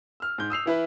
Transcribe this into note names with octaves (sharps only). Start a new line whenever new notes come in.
E6 F6
G#2 G6
D#6 E6 C7 F7
E3 E4 B4